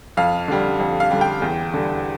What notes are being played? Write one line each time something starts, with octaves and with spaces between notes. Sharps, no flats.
F2 F5
D3 G3
F2
F5
D3 G3
G5
E2
D3 G3